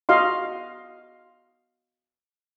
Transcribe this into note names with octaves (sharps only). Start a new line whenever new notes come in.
F#4 D#5 F5 C6